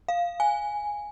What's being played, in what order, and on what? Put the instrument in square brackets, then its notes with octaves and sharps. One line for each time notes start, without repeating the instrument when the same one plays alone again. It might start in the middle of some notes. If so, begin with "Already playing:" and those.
[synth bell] F5
G#5